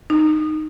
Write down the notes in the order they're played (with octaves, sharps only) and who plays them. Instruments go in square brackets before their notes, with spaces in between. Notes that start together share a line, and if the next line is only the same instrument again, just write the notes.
[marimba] D#4